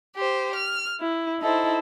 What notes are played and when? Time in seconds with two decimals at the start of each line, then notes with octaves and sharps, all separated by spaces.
0.16 G4 C5
0.55 F6
1.00 E4
1.40 D#4 E4 A4 C5